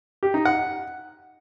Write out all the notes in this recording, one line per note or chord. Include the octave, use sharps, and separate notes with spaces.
G4
D#4
F#5